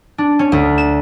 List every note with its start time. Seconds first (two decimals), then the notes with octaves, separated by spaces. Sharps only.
0.18 D4
0.39 C#4
0.52 D2
0.78 E7